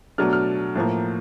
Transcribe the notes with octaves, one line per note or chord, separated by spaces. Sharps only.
B2 F#3 A3 D4 F6
F6
A2 F3 A#3